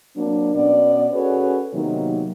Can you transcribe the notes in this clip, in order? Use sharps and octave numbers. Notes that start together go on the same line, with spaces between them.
F#3 A#3 C4 D4
B2 B3 C#4 D5
C#4 F#4 G#4 A4 B4 C#5
C3 D#3 F#3 A#3 B3 D#4